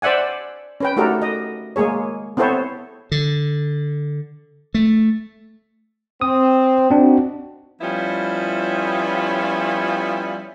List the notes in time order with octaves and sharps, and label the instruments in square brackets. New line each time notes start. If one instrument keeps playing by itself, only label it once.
[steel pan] C5 D5 E5 F#5 G#5
C#4 B4 G5
A3 D#4 F#4 G4 A4 A#4
D#5
G#3 A#3 G#4 C#5
B3 C4 E4 A4 C5 C#5
[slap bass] D3
A3
[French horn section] C4 [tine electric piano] D#6
[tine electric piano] C4 D4 [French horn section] D#4 F#4
[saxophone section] F3 G3 B3 C#4 E4 F4